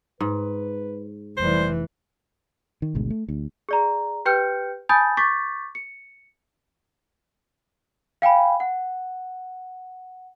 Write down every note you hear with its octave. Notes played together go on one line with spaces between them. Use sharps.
G#2 B4
F1 E3 G3 C5
D#3
G#1 D2 B2 G#3
A3
D2
G#4 D5 A#5
G4 B4 G5 F6 G6 C#7
G#5 A5 B5 D#6 G6 A6
C#6 D6 G6 A6 B6
C#7
F5 G5 G#5 B5
F#5